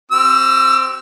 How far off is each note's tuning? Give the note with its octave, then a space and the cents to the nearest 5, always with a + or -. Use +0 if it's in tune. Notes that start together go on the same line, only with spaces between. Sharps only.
C4 +0 F#4 +45 E6 +35